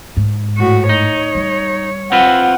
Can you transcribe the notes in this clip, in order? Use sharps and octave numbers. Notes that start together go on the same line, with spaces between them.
G#2
A2 F#4
D#4 C#5
G3
C4 F4 B4 F#5